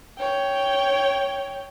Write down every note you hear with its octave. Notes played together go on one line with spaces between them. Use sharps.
C#5 G5